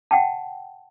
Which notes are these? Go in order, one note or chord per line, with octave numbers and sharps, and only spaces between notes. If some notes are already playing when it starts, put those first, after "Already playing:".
F#5 G5 A5